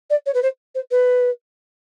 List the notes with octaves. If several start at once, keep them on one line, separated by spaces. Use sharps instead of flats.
D5
C#5
B4
C5
C5
B4